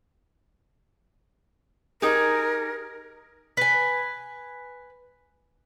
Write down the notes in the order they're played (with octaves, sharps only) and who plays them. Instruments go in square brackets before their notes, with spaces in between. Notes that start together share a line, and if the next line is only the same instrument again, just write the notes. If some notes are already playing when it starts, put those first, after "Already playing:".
[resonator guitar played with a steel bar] D#4 G4 G#4 [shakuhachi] A#4
[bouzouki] B4 G#5